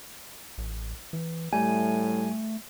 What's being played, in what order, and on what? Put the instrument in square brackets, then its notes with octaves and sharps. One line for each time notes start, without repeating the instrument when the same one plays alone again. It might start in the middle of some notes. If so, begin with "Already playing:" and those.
[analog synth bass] A1
E3
[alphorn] A2 [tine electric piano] G3 [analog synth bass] A3 [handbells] G#5